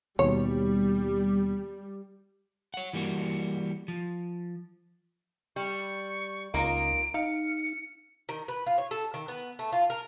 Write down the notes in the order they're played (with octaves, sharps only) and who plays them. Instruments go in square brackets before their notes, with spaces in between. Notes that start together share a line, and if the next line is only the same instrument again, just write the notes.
[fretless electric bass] D#2 B2 [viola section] G3 [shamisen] C#5
[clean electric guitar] C#5 F#5
E3 G3 A#3 F#4
F3
[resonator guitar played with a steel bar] G3 [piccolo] C#6
[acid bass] C#2 [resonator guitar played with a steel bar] A#3 D#4 F4 [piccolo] D7
[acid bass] D#4 [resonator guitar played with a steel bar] F5 [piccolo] C#7
[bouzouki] D#3
B4
F4
C#5
A4
D#3
B3
A3
F4
A#4